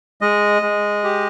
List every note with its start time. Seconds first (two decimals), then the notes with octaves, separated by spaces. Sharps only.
0.21 G#3 D#5
0.62 G#3
1.04 G4